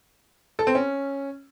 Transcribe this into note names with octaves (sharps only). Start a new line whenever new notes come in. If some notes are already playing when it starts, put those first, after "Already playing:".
A4
C4
C#4